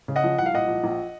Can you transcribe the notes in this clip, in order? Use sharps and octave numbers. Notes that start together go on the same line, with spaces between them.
C#3
D#5 F#5
F3
C2 F#5
F5
A#2 D#5 F#5
F3
A#1